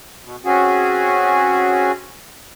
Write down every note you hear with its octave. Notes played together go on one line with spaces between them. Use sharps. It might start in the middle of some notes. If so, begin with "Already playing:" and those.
B2
C4 C#4 F#4 G#4